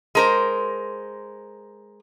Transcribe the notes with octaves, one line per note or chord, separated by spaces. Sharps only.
G#3 A#4 C5